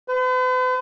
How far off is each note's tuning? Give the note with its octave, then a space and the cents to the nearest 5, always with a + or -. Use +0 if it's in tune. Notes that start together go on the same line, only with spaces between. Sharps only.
B4 +45